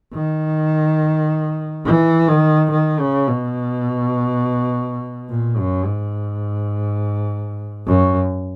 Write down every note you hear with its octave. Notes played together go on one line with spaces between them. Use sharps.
D#3
E3
D#3
D#3
C#3
B2
A#2
F#2
G#2
F#2